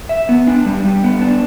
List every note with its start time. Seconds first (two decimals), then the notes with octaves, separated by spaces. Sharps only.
0.09 E5
0.29 B3
0.47 D4
0.66 G3
0.85 G3
1.03 B3
1.22 D4